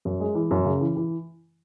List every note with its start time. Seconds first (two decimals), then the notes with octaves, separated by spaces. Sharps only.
0.05 F#2
0.20 G#3
0.35 E3
0.51 F#2
0.66 C#3
0.81 E3
0.97 E3